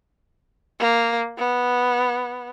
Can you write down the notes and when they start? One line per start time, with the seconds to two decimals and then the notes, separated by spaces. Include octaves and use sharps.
0.80 A#3
1.38 B3